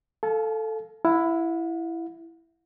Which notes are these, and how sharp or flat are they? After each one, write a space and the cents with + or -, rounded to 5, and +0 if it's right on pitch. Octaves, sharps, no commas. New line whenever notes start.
A4 +0 F5 +0 A5 -45
E4 +10 F#5 -45